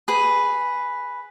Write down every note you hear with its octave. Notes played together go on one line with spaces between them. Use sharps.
G#4 B4